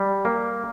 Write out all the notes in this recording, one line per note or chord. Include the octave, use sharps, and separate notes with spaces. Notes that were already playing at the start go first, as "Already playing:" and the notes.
Already playing: G3
A#3